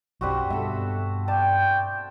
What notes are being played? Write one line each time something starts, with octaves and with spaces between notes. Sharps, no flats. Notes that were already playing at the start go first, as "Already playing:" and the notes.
B1 F#2 G3 C4 F#4
G2 B2 A4 E5
D5 G5 A5